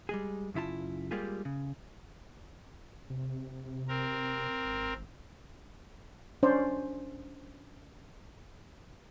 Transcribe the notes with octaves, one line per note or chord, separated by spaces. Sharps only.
G3 G#3 G#4
F#2 C#3 E4 F4 A5
G3 G#3 A#3 F4 G4 G#4
C#3
C3
C4 A#4
G#1
C#4 D4 C5 D5